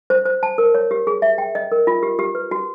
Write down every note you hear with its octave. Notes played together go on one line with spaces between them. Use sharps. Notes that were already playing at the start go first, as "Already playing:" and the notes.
C5
C5
A5
A#4
C#5
G4
G#4
E5
G5
D#5
A#4
F4
G4
G4
B4
F#4